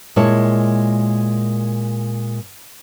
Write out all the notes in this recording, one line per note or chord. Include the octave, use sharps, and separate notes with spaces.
A#2 G#3 E4 C#5 A5